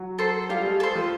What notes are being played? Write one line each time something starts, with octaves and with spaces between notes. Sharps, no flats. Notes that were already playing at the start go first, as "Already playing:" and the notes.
Already playing: F#3 F#4
A4 C5
G3 F4 G4
G#3 G#4
A4 C5
F3 F4